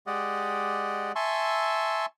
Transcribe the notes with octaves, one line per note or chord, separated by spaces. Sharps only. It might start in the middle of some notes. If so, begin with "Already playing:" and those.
G#3 G4 D5 D#5 F#5
E5 G#5 A5 C6 C#6 E6